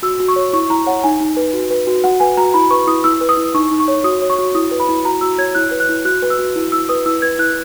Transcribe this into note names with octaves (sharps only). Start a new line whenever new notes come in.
F#4 E6
F#4
C#6
C#5
E4 C#6
E4 A#5
C#5 F#5
D#4 G#5
D#4
B4
F#4
B4
F#4
F#4 F#5
B4 G#5
F#4 A#5
E4 B5
B4 C#6
E4 D#6
E4 E6
B4
D#6
E4
D#4 C#6
D#4
C#6
C#5
F#4 D#6
C#5
C#6
F#4
E4 D#6
B4
B5
E4
F#4 A#5
F#4 E6
C#5 G#6
E4 F#6
B4
F#6
E4
F#4 F#6
B4
E6
F#4
E4
E4 E6
B4 D#6
E4 E6
B4 G#6
E4 F#6